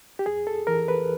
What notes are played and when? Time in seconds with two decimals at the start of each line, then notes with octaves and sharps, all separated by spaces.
0.19 G4
0.26 F2 G#4
0.47 A4
0.67 E3 A#4
0.88 B4